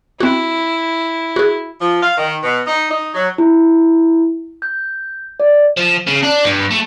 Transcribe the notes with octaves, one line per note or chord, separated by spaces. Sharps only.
C4 E4 F#4
F#4 G#4
F3
F5
D#3
B2
D#4
D#4
F#3
E4
G6
D5
F3
C#3
D4
G2
A3